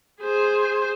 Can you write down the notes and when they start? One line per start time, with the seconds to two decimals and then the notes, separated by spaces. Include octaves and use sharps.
0.22 G#4 C5